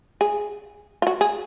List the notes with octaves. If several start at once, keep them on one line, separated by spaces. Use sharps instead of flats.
G#4
F4
F#4
G#4